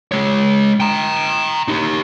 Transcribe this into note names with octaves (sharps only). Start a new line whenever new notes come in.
G#3 C#5
G5 A#5
D#4 G4